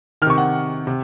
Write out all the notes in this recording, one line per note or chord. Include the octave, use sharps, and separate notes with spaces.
C3 D#3 C#6 F6
F#5
C3